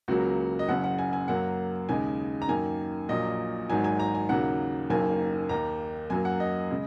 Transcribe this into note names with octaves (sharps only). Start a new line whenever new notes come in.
C#2 C#3 F#3 A#3 F#4
D#5
F#1 F#2 C#3 F#5
F#5
G#5
G#5
F#2 F#3 A#3 F#5
D#2 C#3 G#3 G#5
A#5
F#2 D#3 A#3 G#5
A#1 A#2 F#3 A#3 D#5
G#1 G#2 F#3 A#3 G#5
G#5
A#5
G#5
D#2 C#3 F#3 A#3 F#5
F#1 F#2 D#3 A#3 G#5
D#2 D#3 A#3 A#5
F#2 F#3 A#3 G#5
F#5
D#5
C#3 G#3